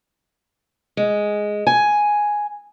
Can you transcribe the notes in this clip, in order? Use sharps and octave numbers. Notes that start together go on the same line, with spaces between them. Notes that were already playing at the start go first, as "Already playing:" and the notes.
G#3
G#5